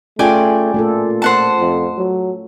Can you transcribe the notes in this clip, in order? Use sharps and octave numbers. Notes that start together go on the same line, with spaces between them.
A3 C#4 F4 G#4 D5 G5 G#5
A#2 A3 F4 A4
C5 F#5 A5
F2
F#3